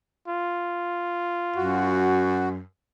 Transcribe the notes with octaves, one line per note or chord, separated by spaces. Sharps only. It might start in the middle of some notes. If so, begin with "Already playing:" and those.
F4
F#2 F#4